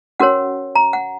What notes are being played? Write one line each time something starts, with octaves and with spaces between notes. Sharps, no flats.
C#4 F#4 A#4 C#5 F#5
A#5
F#5